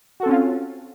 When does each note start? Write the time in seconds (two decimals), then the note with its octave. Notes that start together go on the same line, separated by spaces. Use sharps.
0.20 F#4
0.23 A4
0.26 C4
0.29 C#4
0.32 F4